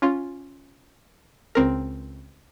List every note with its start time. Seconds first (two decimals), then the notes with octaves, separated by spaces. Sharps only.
0.02 C#4 F4
1.55 C#2 C4 A#4